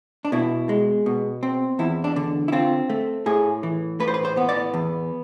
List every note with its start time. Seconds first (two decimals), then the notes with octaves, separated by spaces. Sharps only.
0.25 D4
0.32 B2 E4
0.69 G#3
1.06 B2
1.43 C4
1.79 E2 E4
2.04 D4
2.16 D3
2.48 E4
2.52 C4 F4
2.90 A3
3.26 A2 G#4
3.63 E3
4.00 A2 B4
4.08 C5
4.14 B4
4.25 C5
4.37 B3
4.49 D5
4.74 E2